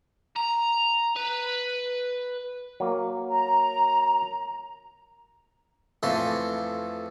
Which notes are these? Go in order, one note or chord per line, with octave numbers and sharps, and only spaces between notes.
A#5
B4
F#3 A#3
A#5
F2 E3 A3 C6